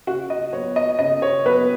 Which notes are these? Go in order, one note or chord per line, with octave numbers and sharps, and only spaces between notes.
C#3 F#4
D#5
F#3 B3 C#5
D#5
C#3 D#5
C#5
F#3 B3 B4